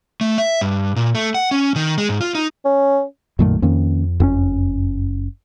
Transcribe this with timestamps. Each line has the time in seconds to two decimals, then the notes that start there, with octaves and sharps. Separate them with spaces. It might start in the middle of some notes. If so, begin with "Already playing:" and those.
0.21 A3
0.38 E5
0.61 G2
0.96 A#2
1.15 A3
1.34 F#5
1.51 C#4
1.76 D#3
1.98 G#3
2.09 G#2
2.21 F4
2.35 D#4
2.65 C#4
3.39 B1 F#2 A#2 D#3 F#3 A3
3.62 F2 D#3 A#3 C#4
4.20 F#1 F2 C4 C#4